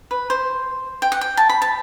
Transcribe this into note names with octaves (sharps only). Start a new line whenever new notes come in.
B4
C5
G5
F#5
G5
A5
B5
A5